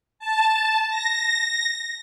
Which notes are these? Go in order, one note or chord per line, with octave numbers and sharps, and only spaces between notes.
A5
A#6